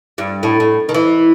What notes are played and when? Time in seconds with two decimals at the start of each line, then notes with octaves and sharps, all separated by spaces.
0.18 G2
0.43 A2
0.60 A2
0.89 D#3
0.94 E3